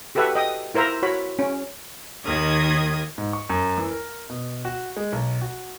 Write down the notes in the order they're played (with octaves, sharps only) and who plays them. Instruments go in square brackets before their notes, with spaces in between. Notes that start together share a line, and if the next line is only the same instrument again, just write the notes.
[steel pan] F#4 G4 A4 B4 E5 F#5
D#5 G5 D#6
E4 A#4 C5 E5 A#5
F#4 C#5 B5
C#4
[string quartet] D#2 D#3 D#6 G#6
[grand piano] G#2
C#6
F#2
E3
A#4
B2
F#4
G#3
B1
F#4